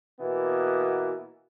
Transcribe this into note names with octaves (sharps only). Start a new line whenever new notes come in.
B2 E3 A#3 B3